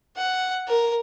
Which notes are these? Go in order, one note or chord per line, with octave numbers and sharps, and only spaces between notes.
F#5
A#4